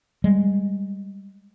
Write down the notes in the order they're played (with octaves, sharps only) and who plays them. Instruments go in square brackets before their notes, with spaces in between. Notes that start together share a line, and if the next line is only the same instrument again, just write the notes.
[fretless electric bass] G3 G#3